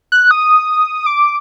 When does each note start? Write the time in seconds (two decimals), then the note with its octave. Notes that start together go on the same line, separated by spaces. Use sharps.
0.12 F#6
0.31 D#6
1.06 D6